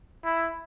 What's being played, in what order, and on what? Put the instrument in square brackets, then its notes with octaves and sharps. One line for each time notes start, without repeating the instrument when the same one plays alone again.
[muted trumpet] E4